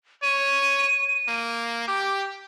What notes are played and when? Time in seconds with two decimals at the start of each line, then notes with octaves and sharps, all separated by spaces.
0.23 C#5 D#7
1.28 A#3
1.88 G4 D6